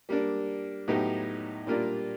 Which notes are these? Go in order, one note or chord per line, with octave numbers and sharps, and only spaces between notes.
G3 A#3 D4
A2 F#3 B3 D#4 G4
A#2 G3 A#3 D4 F4